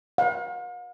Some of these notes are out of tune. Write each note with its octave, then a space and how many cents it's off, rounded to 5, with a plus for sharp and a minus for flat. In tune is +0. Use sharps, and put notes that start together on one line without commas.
F5 +45